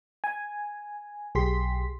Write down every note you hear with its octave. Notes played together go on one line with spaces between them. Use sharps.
G#5
B1 G4 G#4 C6 B6